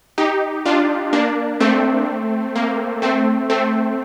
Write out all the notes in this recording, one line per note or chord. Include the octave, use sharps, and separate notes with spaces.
D#4 G4
D4 F4
A#3 D4
A3 C4
A#3
A3 C4
A3 C4